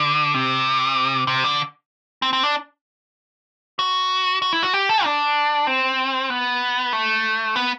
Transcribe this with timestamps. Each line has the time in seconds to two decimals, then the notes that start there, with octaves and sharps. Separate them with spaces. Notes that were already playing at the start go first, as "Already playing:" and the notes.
Already playing: D3
0.34 C3
1.27 C3
1.44 D3
2.22 C4
2.33 C4
2.43 D4
3.79 F#4
4.42 F#4
4.52 E4
4.63 F#4
4.74 G4
4.89 A4
5.04 D4
5.67 C4
6.30 B3
6.93 A3
7.56 B3